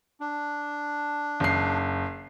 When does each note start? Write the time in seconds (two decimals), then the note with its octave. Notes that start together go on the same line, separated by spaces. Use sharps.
0.21 D4
1.40 F#1 C7